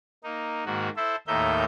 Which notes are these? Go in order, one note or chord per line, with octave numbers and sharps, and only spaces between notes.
A#3 D#4
G#2 D#3 A#3 F#4
E4 A4 C5 E5
D#2 A2 A#3 D#4 E5 G6